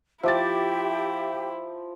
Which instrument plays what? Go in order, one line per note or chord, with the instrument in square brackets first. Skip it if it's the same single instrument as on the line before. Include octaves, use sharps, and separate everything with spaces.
[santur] F3 [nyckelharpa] E4 [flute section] G4 [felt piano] E5 D6 A6